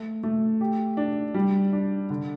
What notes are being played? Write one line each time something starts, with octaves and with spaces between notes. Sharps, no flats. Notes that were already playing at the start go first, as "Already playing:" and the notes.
Already playing: A3
A3
G4
D4
G3
D4
D3